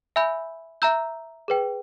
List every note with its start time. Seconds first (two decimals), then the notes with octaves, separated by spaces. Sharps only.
0.16 E5 G#5 B5 E6 G6
0.82 E5 A#5 E6 G6
1.48 G#4 B4 G5